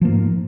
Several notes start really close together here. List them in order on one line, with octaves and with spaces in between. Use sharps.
F3 A#3 G#2